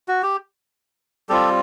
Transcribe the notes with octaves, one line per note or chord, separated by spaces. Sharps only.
F#4
G4
G3 C4 F4 G4 A4